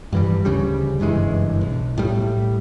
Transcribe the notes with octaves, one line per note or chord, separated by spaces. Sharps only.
G2 E3 G3
D2 C#3 G3
F#1 G2 E3 G#3
B1
A2 G3